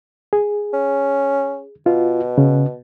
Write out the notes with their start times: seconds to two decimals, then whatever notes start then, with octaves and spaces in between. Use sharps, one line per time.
0.33 G#4
0.73 C#4
1.86 B2 F4
2.38 C#3